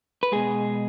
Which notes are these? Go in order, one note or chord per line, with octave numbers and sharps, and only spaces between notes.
B4
B2 G#3 G#4